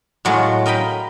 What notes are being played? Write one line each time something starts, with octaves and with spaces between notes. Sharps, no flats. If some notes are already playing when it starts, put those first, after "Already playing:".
A2 F#3 G#3 F4
A#4 D#5 F5 G5 B5